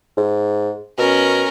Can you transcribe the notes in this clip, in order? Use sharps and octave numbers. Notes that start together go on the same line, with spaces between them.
G#2
B2 C#4 A#4